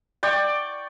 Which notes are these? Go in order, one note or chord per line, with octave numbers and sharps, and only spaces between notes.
D5 G5 C#6